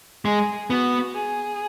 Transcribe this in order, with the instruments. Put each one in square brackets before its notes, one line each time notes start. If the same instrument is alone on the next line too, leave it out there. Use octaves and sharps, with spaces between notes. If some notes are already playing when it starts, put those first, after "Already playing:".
[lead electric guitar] G#3 [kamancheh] G#4
[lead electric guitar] B3 [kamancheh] F#4
[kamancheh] G#4